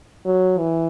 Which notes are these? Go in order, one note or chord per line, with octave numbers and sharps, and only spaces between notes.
F#3
E3